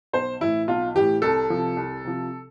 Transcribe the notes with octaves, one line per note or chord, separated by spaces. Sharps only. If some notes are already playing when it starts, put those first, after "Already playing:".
B1 C5
A2 E3 E4
B1 F4
A2 E3 G4
C2 A4
C3 F3
C2
C3 F3